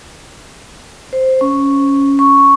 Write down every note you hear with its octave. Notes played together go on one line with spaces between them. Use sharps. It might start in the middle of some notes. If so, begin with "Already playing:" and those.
C5
C#4
C#6